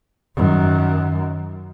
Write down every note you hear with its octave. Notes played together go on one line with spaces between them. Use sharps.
F#2 D#3